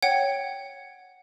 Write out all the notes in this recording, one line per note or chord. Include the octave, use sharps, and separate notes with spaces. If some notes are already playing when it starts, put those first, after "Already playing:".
C#5 F#5 G5